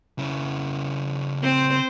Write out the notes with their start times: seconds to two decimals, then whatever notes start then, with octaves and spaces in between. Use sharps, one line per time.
0.19 C#3 E4
1.43 C4 C5